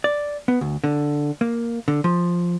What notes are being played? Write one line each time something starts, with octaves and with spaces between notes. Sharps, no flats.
D5
B3
D2
D3
A#3
D3
F3